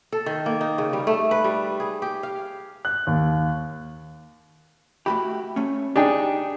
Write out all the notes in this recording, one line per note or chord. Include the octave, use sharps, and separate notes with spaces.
A4
D#3
A#3
D#4
C#3
G3
A3
B4
G3
G#4
G4
F5
F#6
D#2
A3 F#4 G4 B5
A3 C#4
D4 D#4 G4 G#4 G5